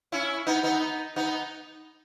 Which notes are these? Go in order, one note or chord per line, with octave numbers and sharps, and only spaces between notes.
C#4 E4
B3 D#4
B3 D#4
B3 D#4